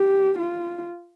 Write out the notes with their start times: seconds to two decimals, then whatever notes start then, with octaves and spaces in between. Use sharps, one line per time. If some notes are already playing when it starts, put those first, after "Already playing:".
Already playing: G4
0.38 F4